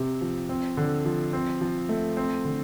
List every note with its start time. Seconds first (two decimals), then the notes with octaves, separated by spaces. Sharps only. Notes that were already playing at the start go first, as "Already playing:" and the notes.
Already playing: C3 C4
0.21 F3
0.49 C4
0.77 D3
1.05 F3
1.33 C4
1.61 F3
1.89 A3
2.17 C4
2.45 D3